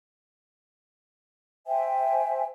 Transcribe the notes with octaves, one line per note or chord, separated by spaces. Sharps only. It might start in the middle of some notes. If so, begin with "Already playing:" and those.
C5 E5 G5 G#5